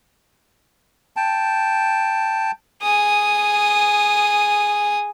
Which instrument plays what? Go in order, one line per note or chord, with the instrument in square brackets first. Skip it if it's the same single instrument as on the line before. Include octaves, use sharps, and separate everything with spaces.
[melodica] G5 A5
[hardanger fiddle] G#4 D#6